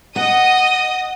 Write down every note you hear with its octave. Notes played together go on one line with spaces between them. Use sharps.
D#5 F#5 D#6